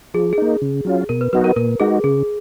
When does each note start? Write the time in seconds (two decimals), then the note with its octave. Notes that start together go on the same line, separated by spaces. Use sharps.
0.14 F3 G#4
0.33 G#4
0.38 A#3 D#4
0.62 C#3
0.85 F#3 C#4 F4
1.09 B2 A#4
1.21 B4
1.33 F#3 B3 D#4 F#4 B4
1.44 A#4
1.56 A#2 A#4
1.80 G#3 D#4 F#4 G#4
2.04 C#3 G#4